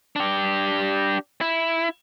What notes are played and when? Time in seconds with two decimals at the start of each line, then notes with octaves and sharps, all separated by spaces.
0.16 D4 G4
1.41 E4